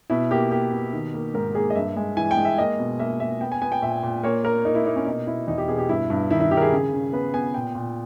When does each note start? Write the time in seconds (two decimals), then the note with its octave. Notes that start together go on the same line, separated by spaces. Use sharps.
0.10 B2 E4
0.31 A#3 G4
0.51 A#3 G4
0.72 B2
0.93 D#3
1.14 A#3
1.34 G#2 A#4
1.55 A#3 G#4
1.70 D#5
1.76 G2 E5
1.96 G#3
2.17 E3 G#5
2.31 G5
2.37 G#3
2.45 E5
2.58 A#3 D#5
2.79 B2
3.00 A#3 E5
3.20 A#3 E5
3.41 B3 G5
3.52 G#5
3.62 B3 G#5
3.72 G5
3.82 A#2 E5
4.03 A#2
4.23 A#3 C#5
4.44 A#3 A#4
4.65 A#3 D#4
4.75 E4
4.85 A#3 D#4
4.96 C#4
5.06 B2 D#4
5.27 B2 E4
5.47 E2 D#4
5.58 G4
5.68 B2 G#4
5.78 G4
5.89 G2 E4
6.10 G2
6.30 D#3 E4
6.41 E4
6.51 D#3 G4
6.57 A#4
6.61 G#4
6.72 C#3
6.93 C#3
7.13 B3 B4
7.34 B3 G#5
7.54 A#2 G5
7.75 A#2